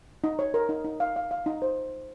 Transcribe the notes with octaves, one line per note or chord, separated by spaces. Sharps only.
D#4
C#5
A#4
D#4
D#4
F5
F5
F5
D#4
C5